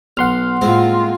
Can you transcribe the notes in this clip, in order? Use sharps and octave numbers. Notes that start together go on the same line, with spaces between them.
B1 F#5 C6 F6
A2 G#3 A#3 C4 F4